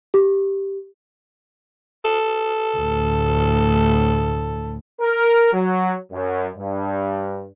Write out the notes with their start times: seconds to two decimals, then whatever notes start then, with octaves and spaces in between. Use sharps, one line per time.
0.14 G4
2.05 A4
2.77 D2 A2
5.01 A#4
5.53 F#3
6.12 F#2
6.57 G2